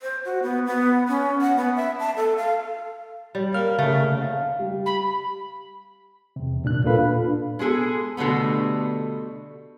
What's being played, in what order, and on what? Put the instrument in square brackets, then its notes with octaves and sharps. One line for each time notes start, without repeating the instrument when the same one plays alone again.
[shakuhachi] C5
F#4
B3
B3
C#4
F#5
B3
E5
A5
A4
F5
[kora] G3 [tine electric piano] C#5
[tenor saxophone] A#3 [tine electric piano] F6
[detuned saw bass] C#3 [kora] A3 [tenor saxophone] A#3
[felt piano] F5
G3
[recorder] B5
[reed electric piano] E2 C3
D#2 A#2 D4 F#6
A#2 F4 A4 B4 F5 B5
D4
[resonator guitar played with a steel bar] G#3 B3 G#4 A4
B2 D3 G3 A3 B3